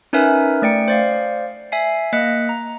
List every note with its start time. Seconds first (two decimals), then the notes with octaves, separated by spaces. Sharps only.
0.13 C#4 D#4 A#4 B4 E5 G#5
0.62 A3 D5 G5 C#7
0.88 C5 D5 F5
1.72 E5 G#5 C7
2.13 A#3 D#5 F#6 B6 C#7
2.49 A#5